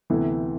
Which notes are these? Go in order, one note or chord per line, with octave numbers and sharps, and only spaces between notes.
D2 C3 E3 B3 E4